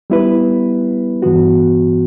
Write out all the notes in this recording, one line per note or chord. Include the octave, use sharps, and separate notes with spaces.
G3 B3 E4 B4
G2 E3 B3 F#4